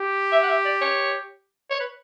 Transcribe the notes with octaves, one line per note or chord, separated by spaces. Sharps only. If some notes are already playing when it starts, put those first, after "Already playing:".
Already playing: G4
E5
F#5
E5
D5
C#5
C#5
B4